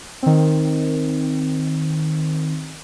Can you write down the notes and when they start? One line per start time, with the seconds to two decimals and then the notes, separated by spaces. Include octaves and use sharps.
0.23 D#3 C4